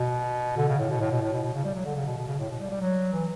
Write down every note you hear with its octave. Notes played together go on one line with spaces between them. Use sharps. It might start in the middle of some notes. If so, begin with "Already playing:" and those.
Already playing: B2
D3
C#3
A2
B2
A2
B2
A2
B2
B2
C#3
G3
F#3
D3
C#3
B2
B2
C#3
A2
B2
G3
G3
F#3
E3